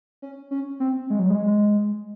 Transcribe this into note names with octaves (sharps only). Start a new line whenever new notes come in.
C#4
C#4
C4
G#3
F#3
G#3